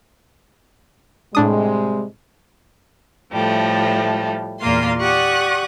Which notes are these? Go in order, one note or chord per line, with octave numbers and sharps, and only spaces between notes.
A2 C3 G3 G#3 D4 D#6
A2 F3 G3 A3
E2 A#2 A#3 F4 C6
G4 D5 F#5 C#6 D#6 F#6